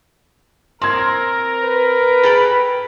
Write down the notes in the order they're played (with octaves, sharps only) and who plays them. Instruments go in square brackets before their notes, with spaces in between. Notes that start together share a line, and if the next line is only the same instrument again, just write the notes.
[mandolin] C4 [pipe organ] A#4 [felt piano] C6 G#6
[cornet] B4
[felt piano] G#4 [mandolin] A4 G5 B5